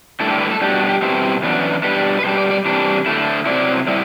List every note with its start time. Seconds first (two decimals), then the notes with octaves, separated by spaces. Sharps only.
0.20 G2 D3 A3 E4 A4
0.31 G4
0.40 B4
0.51 A4
0.61 B2 G3 D4 G4
0.75 F#4
0.89 G4
1.02 B2 G3 C4 E4
1.43 F#2 E3 B3 D4
1.83 B2 G3 D4 B4
2.19 B4
2.24 B2 G3 D4 C5
2.38 D5
2.51 D5
2.65 C3 E3 G3 D4
3.06 D3 A3 E4
3.46 C3 F#3 C4 E4 D5
3.87 A2 G3 C4 E4